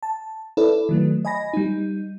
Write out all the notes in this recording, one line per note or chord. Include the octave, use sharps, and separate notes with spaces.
A5
E4 A4 B4 D5
D#3 F#3 A3
D#5 G#5 B5 A#6
G3 D#4